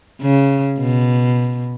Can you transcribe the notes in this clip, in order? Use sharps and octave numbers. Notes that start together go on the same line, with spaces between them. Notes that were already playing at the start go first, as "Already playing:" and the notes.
C#3
B2